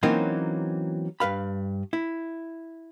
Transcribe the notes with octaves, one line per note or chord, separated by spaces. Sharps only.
E3 F#3 A#3 C4 C#4 D#4
G2 B4 F5 B5
E4